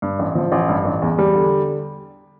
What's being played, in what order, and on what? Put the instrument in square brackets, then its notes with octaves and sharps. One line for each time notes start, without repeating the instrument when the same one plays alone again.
[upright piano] G2
A1
F3
A1
G2
A1
E2
G3
D3